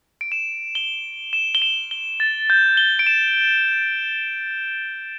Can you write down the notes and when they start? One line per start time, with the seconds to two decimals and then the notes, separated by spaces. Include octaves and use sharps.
0.21 D7
0.32 E7
0.75 G7
1.33 E7
1.55 G7
1.62 E7
1.91 G7
2.20 A6
2.50 G6
2.77 G7
2.99 D7
3.07 E7